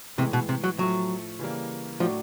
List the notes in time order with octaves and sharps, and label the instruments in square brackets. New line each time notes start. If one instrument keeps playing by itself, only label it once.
[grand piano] A2 E3 G#3 [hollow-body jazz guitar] C3
[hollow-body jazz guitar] B2
C3
F#3
[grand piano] A2 F3 A3 [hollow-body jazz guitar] F#3
[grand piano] C#3 E3 G3 A#3
[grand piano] A2 F#3 A3 D4 F#4 [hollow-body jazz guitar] F3